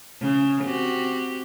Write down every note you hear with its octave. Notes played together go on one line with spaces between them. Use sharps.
C#3
C4 F#4 G4